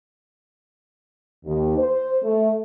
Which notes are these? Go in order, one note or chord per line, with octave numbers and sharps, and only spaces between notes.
D#2
C5
A3